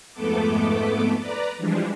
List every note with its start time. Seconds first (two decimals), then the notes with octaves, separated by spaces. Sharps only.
0.13 F2 G#2 A3 B3 A4 D6
1.19 B4 D5 A#5
1.58 E3 F3 G3 G#3 D4